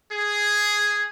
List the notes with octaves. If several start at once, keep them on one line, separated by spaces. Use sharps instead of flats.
G#4